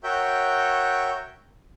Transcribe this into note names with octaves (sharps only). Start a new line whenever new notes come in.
F#4 A#4 C#5 E5 G5 G6